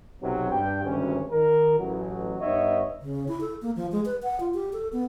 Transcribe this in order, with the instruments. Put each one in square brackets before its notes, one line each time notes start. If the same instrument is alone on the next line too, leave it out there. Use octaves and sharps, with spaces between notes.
[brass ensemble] B1 C3 F#3
G2 G5
G#1 D2 G2 C3 C#4
D#3 A#4
A1 F#3
G2 B3 D#4 C#5 D#5 E5
[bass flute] C#3
E4
A4
A#3
F3
G#3
B4
F#5
F4
G4
A4
B3